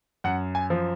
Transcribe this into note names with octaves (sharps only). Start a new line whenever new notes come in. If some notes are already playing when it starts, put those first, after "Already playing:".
F#2 F#5
G#5
F3